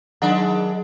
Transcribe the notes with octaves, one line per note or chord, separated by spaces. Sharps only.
D#3 F#3 G#3 D4